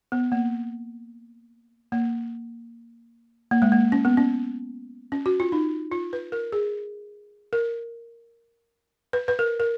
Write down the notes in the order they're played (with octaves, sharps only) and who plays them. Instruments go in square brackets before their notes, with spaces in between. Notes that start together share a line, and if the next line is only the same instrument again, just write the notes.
[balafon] B3
A#3
A#3
A#3
G#3
A#3
C#4
B3
C#4
C#4
F#4
F4
D#4
F4
B4
A#4
G#4
A#4
B4
B4
A#4
A#4